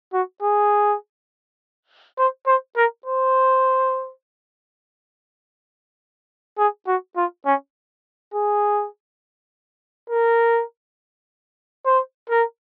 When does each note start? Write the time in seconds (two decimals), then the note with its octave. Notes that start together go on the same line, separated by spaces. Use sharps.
0.13 F#4
0.42 G#4
2.18 C5
2.47 C5
2.76 A#4
3.06 C5
6.58 G#4
6.87 F#4
7.17 F4
7.46 C#4
8.34 G#4
10.10 A#4
11.86 C5
12.30 A#4